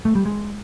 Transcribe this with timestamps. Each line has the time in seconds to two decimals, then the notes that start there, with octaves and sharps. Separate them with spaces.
0.05 A3
0.15 G3
0.26 G#3